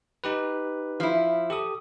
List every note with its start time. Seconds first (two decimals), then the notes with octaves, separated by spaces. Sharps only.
0.24 D#4 G4 B4
1.00 F3 E4
1.50 G4 A4 D#6